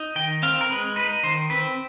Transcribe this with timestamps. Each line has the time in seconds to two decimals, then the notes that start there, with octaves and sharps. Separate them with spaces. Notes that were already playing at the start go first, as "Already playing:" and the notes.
Already playing: D#4
0.16 D#3 G5
0.43 C4 F5
0.61 A#4
0.70 G#3 B4
0.96 D#4 B4
1.23 D#3 C5
1.50 C4 B4